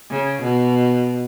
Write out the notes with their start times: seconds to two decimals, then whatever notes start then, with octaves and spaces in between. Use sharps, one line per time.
0.11 C#3
0.42 B2